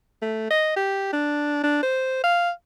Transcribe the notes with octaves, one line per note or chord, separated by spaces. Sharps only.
A3
D#5
G4
D4
D4
C5
F5